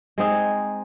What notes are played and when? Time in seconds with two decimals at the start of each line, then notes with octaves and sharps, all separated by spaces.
0.18 G#3 C4 D#4 G#4